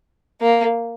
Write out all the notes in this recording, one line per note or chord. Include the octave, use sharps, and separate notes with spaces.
A#3